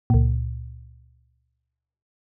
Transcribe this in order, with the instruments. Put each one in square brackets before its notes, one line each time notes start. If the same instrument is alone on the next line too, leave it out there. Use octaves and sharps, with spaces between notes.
[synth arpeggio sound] C#2 A#2